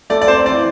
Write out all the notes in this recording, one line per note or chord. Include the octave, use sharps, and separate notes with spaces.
A3 D5
D5
C4 C5
E3 D5